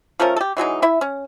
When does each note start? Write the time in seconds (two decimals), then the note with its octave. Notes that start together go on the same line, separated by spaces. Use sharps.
0.20 F3 A3 C#4 A#4
0.36 G4 A4
0.57 E3 F#3 G#3 D#4
0.82 E4 E5
1.01 C#4